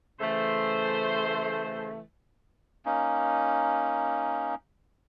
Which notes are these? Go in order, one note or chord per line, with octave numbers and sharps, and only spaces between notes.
C#3 E3 A3 C5
A#3 C#4 D#4